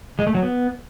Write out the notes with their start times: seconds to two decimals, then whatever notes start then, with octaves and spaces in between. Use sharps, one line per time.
0.19 G#3
0.27 A3
0.35 F#3
0.43 B3